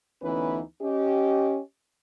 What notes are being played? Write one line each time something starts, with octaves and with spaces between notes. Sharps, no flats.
D2 E3 B3 C#4 D#4 B4
C#4 G4 D#5